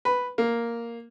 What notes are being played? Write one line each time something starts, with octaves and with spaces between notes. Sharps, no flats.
B4
A#3